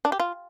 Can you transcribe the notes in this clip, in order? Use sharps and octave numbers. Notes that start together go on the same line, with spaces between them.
D4
G4
F4